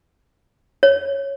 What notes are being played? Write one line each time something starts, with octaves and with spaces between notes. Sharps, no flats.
C#5